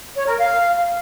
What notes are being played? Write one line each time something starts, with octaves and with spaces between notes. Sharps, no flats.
C#5
A#4
F5